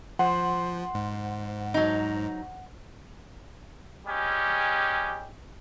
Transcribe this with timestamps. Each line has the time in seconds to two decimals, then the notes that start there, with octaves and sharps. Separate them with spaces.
0.19 F3 C5 F#5
0.95 G#2
1.74 F#3 D#4
4.06 G3 G#3 C#4 G4